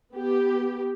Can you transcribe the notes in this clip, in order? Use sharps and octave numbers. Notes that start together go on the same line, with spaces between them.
B3 G4